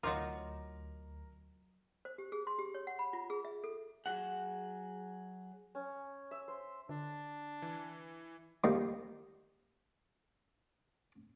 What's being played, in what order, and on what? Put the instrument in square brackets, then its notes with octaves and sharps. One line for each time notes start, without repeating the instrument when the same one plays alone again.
[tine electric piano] D2 [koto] F#3 D#4 F4 [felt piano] A#4 [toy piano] D#5 C6 D6
[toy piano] C5
G4
G#4
C6
G4
C#5
F#5
B5
F4
G#4
E5
A4
[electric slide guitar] F#3 G#4 F#5
[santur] C#4
E5
C5
[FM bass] D3 [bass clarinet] D4
[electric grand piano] E3
[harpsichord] D#3 G3 A#3 D#4